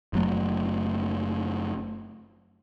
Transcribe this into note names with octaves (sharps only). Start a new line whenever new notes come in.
F#1 F#3 A3